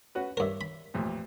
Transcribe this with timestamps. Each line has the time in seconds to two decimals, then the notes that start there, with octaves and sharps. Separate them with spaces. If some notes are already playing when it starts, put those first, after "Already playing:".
0.15 C#4 F#4 B4
0.37 G2 A#4 C#5 E5
0.61 B5
0.94 A1 F2 A#2